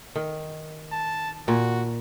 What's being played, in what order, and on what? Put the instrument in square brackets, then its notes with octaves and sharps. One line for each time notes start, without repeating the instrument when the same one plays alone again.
[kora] D#3
[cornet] A5
[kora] A#2 [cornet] F#4